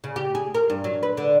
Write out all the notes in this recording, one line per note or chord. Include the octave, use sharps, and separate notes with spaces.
C#3
G4
G#4
A#4
G2
F#3
B4
D3